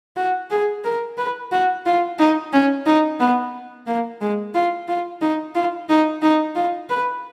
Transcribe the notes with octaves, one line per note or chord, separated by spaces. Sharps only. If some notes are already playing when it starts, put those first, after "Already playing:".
F#4
G#4
A#4
B4
F#4
F4
D#4
C#4
D#4
B3
A#3
G#3
F4
F4
D#4
F4
D#4
D#4
F4
B4